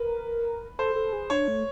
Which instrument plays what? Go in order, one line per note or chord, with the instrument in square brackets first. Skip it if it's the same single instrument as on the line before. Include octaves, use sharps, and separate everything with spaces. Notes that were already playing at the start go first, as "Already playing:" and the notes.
Already playing: [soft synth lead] A#4 [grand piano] B4
[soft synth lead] A4 [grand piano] C5
[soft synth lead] A4
G#4
[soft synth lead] D4 [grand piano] C#5
[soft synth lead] A3